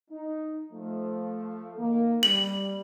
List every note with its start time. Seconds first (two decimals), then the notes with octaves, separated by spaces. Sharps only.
0.11 D#4
0.73 F3 A3
1.78 D#3 A#3
2.23 G3 F#7